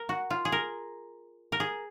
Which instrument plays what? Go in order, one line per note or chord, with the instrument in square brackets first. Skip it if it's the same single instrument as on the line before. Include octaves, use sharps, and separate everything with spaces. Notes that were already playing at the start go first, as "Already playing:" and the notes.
Already playing: [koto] A#4
F#4
F4
G#4
A#4
A#4
G#4